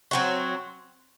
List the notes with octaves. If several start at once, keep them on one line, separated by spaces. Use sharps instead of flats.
F#3 C4 F#4